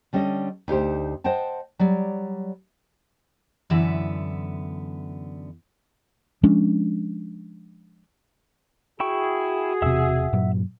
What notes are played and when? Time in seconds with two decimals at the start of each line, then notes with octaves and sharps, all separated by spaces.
0.13 D3 G3 C#4 A4 D#5
0.68 D2 D#4 G4 C5
1.24 C5 D#5 F#5 G5 A5
1.79 F#3 G3 D5
3.70 F#2 D3 E3 B3 E5
6.43 F3 G#3 C#4 D4
9.00 E4 F#4 G#4 G5 C#6
9.82 E1 C3 E5 F#5 E6
10.33 G2 A#2 F#3